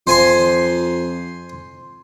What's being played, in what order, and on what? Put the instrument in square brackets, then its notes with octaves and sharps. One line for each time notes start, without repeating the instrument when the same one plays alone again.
[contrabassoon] F2 [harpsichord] C5 G#5 C6